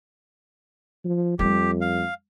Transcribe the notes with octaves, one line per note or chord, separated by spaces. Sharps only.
F3
F2 G3 A3 G4
F5